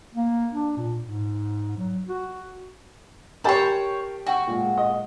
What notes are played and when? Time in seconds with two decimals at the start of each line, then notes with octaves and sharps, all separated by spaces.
0.14 A#3
0.51 D4
0.77 A#2
1.03 G#2
1.77 F#3
2.07 F#4
3.44 G4 A#4 C5 C#5 G5 A5 B5 C7
4.27 F#4 G5 C#6
4.47 A#2 G#3
4.78 D#5